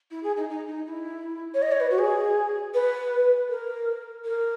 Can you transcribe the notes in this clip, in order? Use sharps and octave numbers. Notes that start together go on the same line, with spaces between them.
E4
G#4
D#4
D#4
D#4
E4
C#5
D#5
C#5
B4
F#4
G#4
B4
A#4
A#4